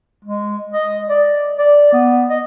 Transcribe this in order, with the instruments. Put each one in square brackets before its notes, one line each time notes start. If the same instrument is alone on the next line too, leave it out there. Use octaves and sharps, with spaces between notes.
[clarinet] G#3
D#5
D5
D5
B3
D#5